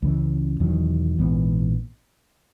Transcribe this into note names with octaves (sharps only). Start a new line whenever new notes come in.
C#2 C#3 E3
E1 E2 D#3 F#3
A#1 G#2 E3 B3